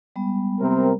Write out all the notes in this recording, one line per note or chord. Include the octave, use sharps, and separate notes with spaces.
G3 G#3 B3
C3 C4 A#4